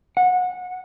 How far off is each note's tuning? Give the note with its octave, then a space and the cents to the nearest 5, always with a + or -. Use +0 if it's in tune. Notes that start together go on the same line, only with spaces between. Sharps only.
F#5 -25